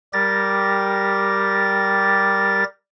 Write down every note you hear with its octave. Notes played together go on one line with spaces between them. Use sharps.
G3 G4 A#4 A6 A#6